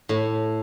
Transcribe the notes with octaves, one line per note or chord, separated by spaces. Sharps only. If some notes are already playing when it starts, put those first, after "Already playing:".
A2